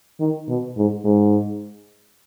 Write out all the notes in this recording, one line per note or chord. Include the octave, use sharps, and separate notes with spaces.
D#3
B2
G#2
G#2